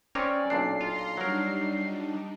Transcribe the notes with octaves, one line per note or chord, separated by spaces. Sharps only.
C4 C#4 A#4 C#5 D5
B1 A#2 D4 C7
F4 A#5 C6
F#3 G3 D4 D#4 A#4